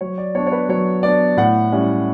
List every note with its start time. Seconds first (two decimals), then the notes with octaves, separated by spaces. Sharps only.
0.01 F#3 C#5
0.18 D5
0.35 B3 D4 C#5
0.47 C#5
0.52 B4
0.69 F#3 C#5
1.03 B3 D4 D5
1.37 A2 F#5
1.72 G3 C#4 E4